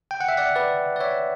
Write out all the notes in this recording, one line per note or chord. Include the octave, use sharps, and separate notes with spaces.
G5
F#5
E5
D5 F#5
B4 D5
D5
C#5 E5